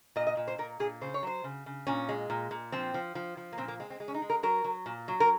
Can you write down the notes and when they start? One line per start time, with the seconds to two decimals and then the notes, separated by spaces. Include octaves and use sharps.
0.16 A#2 D#5
0.27 D#5
0.37 A#2
0.48 C5
0.58 A#2 A#4
0.80 A#2 G#4
1.01 C#3 C5
1.14 C#5
1.23 F#3 C5
1.44 C#3
1.66 C#3
1.87 A#2 C#4
2.09 G#3
2.30 A#2
2.51 A#2
2.72 F3 C4
2.94 F3
3.15 F3
3.37 F3
3.52 A#3
3.58 A#2 C4
3.68 A#3
3.80 G#3 C4
3.90 C4
4.00 G#3
4.08 C#4
4.14 D#4
4.22 G#3
4.30 A#4
4.43 F#3 A#4
4.64 F#3
4.86 A#2
5.08 F#3
5.20 A#4